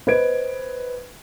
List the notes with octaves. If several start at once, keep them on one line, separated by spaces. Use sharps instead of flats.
B4 C5 D#5 G#6 D7